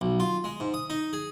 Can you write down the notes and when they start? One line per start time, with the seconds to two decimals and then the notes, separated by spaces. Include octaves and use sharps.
0.01 B1
0.20 F4
0.44 G#3
0.60 G#2
0.74 D#6
0.90 D#4
1.13 G#4